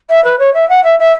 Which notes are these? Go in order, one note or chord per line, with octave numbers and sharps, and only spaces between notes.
E5
B4
C#5
E5
F#5
E5
E5